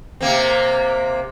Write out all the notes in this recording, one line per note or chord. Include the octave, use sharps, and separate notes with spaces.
C3 A#3 C4